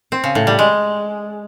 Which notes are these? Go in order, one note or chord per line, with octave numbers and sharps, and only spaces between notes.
C4
C#3
A2
G3
G#3